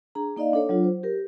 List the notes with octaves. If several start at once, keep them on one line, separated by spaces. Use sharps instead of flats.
D4 G#4 A#5
A#3 D#4 D5 D#5 F5
D4 A4 C#5
F#3 D4 F4
C5
G4 A#4